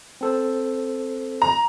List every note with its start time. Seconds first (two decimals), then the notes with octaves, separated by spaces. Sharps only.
0.21 C4 A4 C5
1.42 A#5